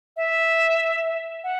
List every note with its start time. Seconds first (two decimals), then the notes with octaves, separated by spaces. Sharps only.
0.17 E5
1.44 F#5